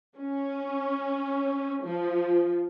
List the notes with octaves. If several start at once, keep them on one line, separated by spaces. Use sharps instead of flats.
C#4
F3